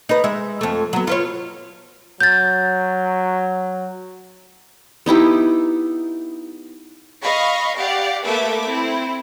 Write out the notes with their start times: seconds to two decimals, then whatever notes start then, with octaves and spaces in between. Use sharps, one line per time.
0.09 D#4 B4
0.24 G#3 E5
0.61 F2 A3
0.93 F#3 B3
1.07 F4 B4 C#5
2.21 F#3 G6 A6
5.06 B3 D#4 E4 G4
7.22 D#5 F5 B5 C#6
7.77 G4 D5 F5 F#5
8.26 A3 A#3 A4 B4 E5 D6
8.67 C4 E4